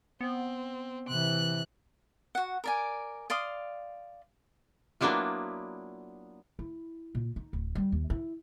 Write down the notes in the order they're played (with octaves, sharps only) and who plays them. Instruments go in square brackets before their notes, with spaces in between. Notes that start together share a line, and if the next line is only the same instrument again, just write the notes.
[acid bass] B3 [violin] C4
[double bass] C3 E3 [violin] F#6
[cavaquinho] F#4 F#5
A#4 D5 G#5
D5 F5 C6 D#6
[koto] F#3 A#3 B3 D4 E4 F4
[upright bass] E4
A#2
D#4
D1
G3
D#2
E4